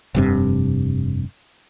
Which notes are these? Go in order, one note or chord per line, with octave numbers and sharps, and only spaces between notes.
F1 G2 C3